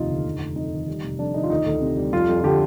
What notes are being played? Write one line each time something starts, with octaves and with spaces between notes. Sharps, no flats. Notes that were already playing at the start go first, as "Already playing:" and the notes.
Already playing: F1 D#2 F3 D#4 F4
D3
F1
F1
F2 D#4
D#3
G3
F1
F2 D4
D#3 D#4
F4
D2 D#4
D2
C3
G3
F2 F4
F2
F4
D3 G4